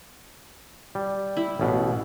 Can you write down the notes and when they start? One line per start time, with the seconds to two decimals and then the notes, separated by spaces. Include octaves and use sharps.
0.95 G3
1.37 E4
1.60 A1 B2